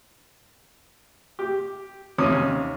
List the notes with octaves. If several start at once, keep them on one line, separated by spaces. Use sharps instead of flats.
G4
D#2 C3 C#4 D#6